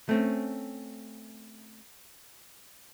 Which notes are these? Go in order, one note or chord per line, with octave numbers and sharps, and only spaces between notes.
A3 C4 C#4